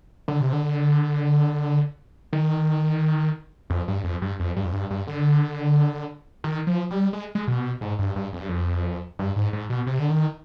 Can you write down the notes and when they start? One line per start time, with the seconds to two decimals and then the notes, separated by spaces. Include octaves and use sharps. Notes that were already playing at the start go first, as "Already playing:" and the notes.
0.28 D3
0.41 C3
0.53 D3
2.33 D#3
3.70 F2
3.88 G2
4.04 F2
4.22 G2
4.39 F2
4.56 G2
4.65 F2
4.73 G2
4.91 G2
5.07 D3
6.44 D#3
6.67 F3
6.91 G3
7.13 G#3
7.35 G#3
7.47 B2
7.81 G#2
7.99 G2
8.16 G2
8.33 F2
8.41 G2
8.49 F2
9.19 G2
9.36 G#2
9.53 G#2
9.70 B2
9.87 C3
9.99 D3
10.10 D#3